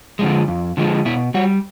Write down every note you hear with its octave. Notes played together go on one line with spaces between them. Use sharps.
D3 F3 G#3
F2
D3 F3 G#3
B2 E4
G3 F#4